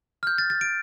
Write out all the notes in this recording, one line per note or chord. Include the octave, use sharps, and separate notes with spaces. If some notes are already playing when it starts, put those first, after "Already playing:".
F6
G6
A6
A6
D7